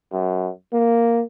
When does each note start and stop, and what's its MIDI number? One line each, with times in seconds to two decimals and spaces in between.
0.12 0.50 42
0.73 1.23 58